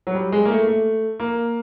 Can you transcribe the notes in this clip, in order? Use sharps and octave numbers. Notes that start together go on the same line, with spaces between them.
F#3
G3
G#3
A#3
A3
A3
A#3